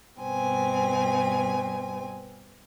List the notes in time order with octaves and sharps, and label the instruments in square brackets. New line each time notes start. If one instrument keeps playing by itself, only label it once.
[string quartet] G2 B2 C4 G#5